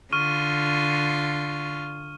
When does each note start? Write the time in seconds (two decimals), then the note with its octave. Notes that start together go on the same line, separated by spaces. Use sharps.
0.13 D3 F4 C#6 F6 D#7